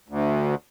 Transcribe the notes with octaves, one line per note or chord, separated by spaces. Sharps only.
D2